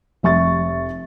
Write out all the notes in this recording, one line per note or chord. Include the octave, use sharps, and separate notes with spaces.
F1 E5 C#6 A6